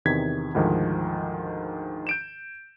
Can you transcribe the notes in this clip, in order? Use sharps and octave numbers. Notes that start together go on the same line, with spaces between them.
E2 C3 D#3 G#6 B6
D2 G#2 D#3 F3
G6 D7 E7